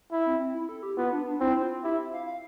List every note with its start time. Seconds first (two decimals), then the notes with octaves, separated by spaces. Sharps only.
0.12 E4
0.26 C4
0.40 C4
0.55 E4
0.69 A4
0.83 G4
0.97 B3 F4
1.13 D4
1.26 D4
1.41 C4 E4
1.62 F4
1.84 E4 G4
2.13 F5
2.26 F5